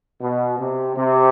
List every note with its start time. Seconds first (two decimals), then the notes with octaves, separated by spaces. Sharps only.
0.22 B2
0.59 C3
0.97 C3